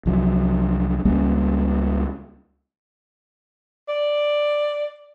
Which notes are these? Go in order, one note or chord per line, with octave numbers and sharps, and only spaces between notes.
C2 F3 F#3
C#2 G3 A#3 C#4
D5